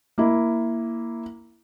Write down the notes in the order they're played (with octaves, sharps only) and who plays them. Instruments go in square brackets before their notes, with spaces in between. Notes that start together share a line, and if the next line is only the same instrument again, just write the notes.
[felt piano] A#3 E4